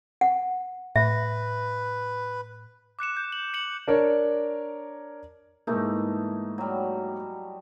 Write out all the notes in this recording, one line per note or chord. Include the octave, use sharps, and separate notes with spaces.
F#5
A2 B4 E5
D6 F#6 C#7 E7
G6
F#7
C#7 E7 F#7
D4 A#4 C#5 D5
G#2 E3 A3 A#3 D#4
F#3 G3